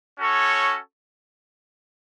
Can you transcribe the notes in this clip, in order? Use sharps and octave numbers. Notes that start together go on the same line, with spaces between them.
C#4 F#4 A4 C#5